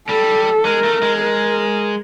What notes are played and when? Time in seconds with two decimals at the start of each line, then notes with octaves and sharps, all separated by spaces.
0.09 G3 A4
0.65 G#3 A#4
0.84 A3
1.03 G#3
1.22 A#4